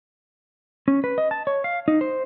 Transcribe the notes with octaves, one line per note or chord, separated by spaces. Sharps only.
C#4
B4
D#5
A5
C#5
F5
D#4
C5